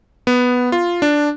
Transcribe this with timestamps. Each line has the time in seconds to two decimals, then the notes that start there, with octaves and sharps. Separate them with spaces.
0.27 B3
0.72 F4
1.02 D4